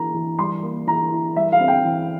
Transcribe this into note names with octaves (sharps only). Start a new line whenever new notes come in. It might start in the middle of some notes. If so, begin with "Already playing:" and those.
Already playing: E3 A#3 E4 A#5
E3
G3 C6
A#3
E3 A#5
E4
G3 E5
F5
C4
G5
E3